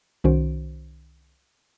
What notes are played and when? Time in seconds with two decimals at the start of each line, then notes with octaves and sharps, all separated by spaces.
0.24 C2 D#3 C#4 F#4 C5 D7